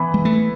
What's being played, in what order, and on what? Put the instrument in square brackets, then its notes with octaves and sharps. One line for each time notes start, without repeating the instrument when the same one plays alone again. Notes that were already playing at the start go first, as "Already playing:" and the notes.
Already playing: [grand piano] E3 B3 E4 B4
[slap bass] G#3
A3